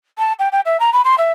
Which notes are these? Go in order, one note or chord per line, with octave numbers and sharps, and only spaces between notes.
A5
G5
G5
E5
A#5
B5
C6
E5